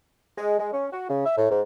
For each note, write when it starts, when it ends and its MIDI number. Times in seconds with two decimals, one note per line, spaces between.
0.37 0.56 56
0.59 0.68 56
0.73 0.86 61
0.92 1.07 66
1.09 1.22 49
1.25 1.34 76
1.37 1.48 45
1.50 1.61 44